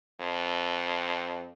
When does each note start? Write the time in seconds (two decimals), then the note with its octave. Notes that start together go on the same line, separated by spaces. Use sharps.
0.20 F2